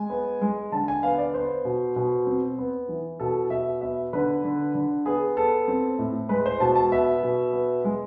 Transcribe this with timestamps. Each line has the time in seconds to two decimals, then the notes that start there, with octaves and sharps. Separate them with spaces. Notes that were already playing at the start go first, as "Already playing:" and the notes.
Already playing: G#3 G#5
0.10 B3
0.42 G#3
0.72 D3 A5
0.88 G#5
1.03 B3 F5
1.18 D5
1.34 B3 C5
1.65 B2
1.96 B2
2.27 C4
2.58 B3
2.89 E3
3.20 B2 A4
3.50 B2 E5
3.81 B3 E5
4.13 D3 B4
4.44 D3
4.75 D3
5.06 B3 G#4
5.37 B3 A4
5.68 C4
5.98 A2
6.29 G#3 B4
6.46 C5
6.60 B2 A5
6.75 A5
6.92 B3 E5
7.23 B2
7.53 B3
7.85 G#3